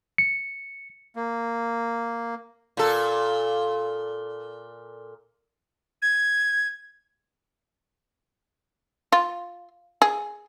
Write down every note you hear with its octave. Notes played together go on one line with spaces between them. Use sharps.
C#7
A#3
A#2 A4
G#6
F4
G#4